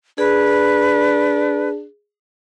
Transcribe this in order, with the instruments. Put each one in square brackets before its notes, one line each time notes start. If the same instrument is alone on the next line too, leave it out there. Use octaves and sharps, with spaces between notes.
[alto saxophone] D4 [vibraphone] G#4 [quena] B4